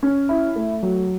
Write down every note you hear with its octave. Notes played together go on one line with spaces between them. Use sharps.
C#4
E4
A3
F#3